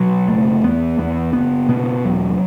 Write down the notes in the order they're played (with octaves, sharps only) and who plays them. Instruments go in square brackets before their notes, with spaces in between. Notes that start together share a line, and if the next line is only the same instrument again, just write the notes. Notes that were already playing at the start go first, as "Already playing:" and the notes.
Already playing: [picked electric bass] B2 F#3
F#1 A3
E2 B3
E2 B3
F#1 B3
B2 B3
E1 F#3